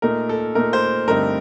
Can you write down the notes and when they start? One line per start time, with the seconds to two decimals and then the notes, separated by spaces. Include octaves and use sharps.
0.02 A#2 A3 D#4 A#4
0.29 A4
0.55 A#2 A3 D#4 A#4
0.73 C5
1.07 G2 D3 A3 C4 D#4 A#4